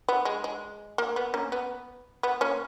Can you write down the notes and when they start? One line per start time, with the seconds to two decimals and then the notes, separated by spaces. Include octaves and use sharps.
0.09 B3
0.25 G#3
0.44 G#3
0.98 A#3
1.16 B3
1.34 A#3 C#4
1.52 B3
2.23 B3
2.41 A#3 C#4